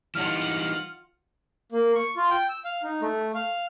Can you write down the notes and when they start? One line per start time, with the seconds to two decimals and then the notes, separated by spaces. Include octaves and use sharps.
0.15 E3 G3 D#4 F4 F#5 F6
1.72 A#3
1.95 C#6
2.17 F4
2.31 G5
2.49 E6
2.65 F5
2.83 D#4
3.02 A3
3.34 F5